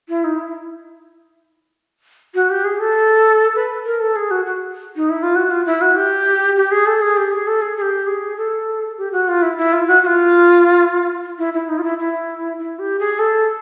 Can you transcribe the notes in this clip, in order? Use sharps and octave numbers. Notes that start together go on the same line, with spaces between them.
E4
D#4
E4
F#4
G4
G#4
A4
B4
A#4
A4
G#4
F#4
F#4
D#4
E4
F4
F#4
F4
E4
F#4
G4
G4
G#4
A4
G#4
G4
G#4
A4
G#4
G#4
G4
G#4
A4
G4
F#4
F4
E4
E4
F4
F#4
F#4
F4
E4
E4
D#4
F4
E4
E4
E4
G4
G#4
A4